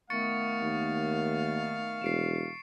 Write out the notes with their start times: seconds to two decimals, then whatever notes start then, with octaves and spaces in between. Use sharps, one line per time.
0.10 D#3 A3 B3 F5 C#6 A6 C#7
0.62 D#2
2.02 E1 C7 D7 E7